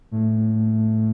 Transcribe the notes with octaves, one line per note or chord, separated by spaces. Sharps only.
A2